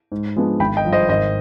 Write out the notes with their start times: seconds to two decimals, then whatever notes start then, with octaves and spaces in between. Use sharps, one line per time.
0.12 G#2
0.36 F3 G#3 B3 D4
0.60 G#1 G5 B5
0.77 D#5 G5
0.85 G2 F3
0.93 C5 D#5
1.09 G#1 C5 D#5